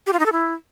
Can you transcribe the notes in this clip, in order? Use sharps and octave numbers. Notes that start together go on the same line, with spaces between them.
G4
F4
D#4
A4
E4